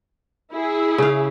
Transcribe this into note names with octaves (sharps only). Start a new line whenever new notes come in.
E4 G#4
C#3 F5